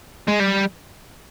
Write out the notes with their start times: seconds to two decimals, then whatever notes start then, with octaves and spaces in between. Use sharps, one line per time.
0.28 G#3
0.40 G3